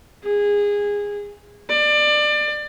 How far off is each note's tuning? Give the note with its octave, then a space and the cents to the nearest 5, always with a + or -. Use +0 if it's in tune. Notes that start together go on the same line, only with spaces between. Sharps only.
G#4 -20
D5 +25